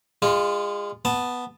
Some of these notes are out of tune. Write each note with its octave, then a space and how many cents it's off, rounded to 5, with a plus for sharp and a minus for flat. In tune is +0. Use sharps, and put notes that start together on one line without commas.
G#3 -30 F4 +0
B3 +0 A5 +0